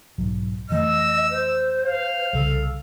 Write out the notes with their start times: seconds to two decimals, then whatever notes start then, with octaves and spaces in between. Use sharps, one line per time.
0.18 B1 G#2 F#3
0.70 F2 E3 A3 D#5 E6
1.30 C5
1.85 F5
2.33 C2 C#3 A4